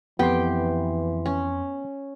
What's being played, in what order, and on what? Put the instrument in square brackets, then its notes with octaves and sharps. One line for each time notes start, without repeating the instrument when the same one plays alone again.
[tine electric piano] F2 C6 [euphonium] E3 [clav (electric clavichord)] B3 [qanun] G4 G5
[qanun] C#4